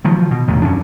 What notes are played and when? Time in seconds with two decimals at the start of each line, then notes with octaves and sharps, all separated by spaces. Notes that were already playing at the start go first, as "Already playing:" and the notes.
0.05 D#3 F3 F#3
0.31 B2
0.48 A1 E2 C3 D#3
0.62 F#2 C#4 D4